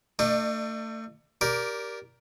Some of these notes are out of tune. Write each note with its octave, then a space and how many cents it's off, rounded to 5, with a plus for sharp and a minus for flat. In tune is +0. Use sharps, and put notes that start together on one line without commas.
A3 +30 D4 +35 D#5 -45
G4 +0 A#4 +10 D5 -15